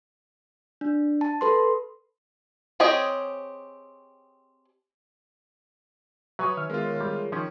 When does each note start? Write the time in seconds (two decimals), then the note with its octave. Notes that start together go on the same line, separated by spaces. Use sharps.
0.81 D4
1.21 A5
1.41 A4 B4 C6
2.80 C4 G4 G#4 C#5 D#5
6.39 F#3 B4 C#5 E5 G#5 C#6 D#6
6.57 D#3 E5 F6
6.70 G#3 B3 F4 G#4 A#4
6.82 G#4 A#4 C#5
7.01 G3
7.32 D#3 F3 C#4